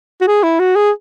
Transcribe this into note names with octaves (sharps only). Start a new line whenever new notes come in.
F#4
G#4
E4
F#4
G#4